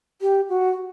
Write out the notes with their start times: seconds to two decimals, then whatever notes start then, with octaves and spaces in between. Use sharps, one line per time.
0.21 G4
0.49 F#4